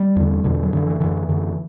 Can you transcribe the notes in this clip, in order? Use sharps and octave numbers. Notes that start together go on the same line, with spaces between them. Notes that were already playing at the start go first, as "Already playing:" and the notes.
Already playing: G3
E2 D3
E2 B2 D3
F#3
F#2 D3 E3
E3
F#2 D3 E3
F#2 D3